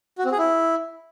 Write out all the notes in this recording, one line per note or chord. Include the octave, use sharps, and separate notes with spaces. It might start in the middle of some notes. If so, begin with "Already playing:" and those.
F#4
C4
G#4
E4